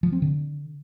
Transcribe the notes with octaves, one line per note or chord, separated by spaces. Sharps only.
F3
C4
D3